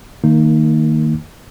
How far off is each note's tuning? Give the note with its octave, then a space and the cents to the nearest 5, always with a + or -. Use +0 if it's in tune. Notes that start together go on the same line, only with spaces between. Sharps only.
D#3 +0 A#3 -20 D#4 -5